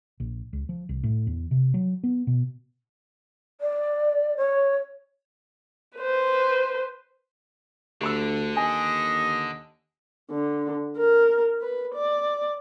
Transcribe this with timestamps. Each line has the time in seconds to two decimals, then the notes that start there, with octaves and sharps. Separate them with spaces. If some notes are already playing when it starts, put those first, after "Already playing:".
0.20 A#1
0.53 C#2
0.69 F3
0.89 C2
1.03 A2
1.27 E2
1.51 C3
1.74 F#3
2.03 B3
2.27 B2
3.61 D5
4.37 C#5
5.98 B4 C5
8.01 D2 D3 G4 B5 E6
8.57 D#2 D#5 G#5
10.30 D3
10.98 A#4
11.62 B4
11.95 D5